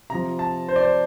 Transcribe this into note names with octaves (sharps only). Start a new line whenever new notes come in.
C3 F3 A#5
A5
C5
D5
C5